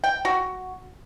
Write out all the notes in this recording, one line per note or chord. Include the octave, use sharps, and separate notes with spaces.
G5
F#4